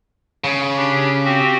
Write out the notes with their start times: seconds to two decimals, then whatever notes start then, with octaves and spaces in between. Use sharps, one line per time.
0.44 C#3
0.77 D4 G4
1.25 C4 F#4 G4